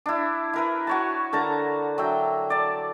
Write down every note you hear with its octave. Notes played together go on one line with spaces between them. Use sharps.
D4 E4
E4 A#4 B4
F#4 C#5 A5
D3 A#4 A5 A#5
F#3 E5 G5
D5 A5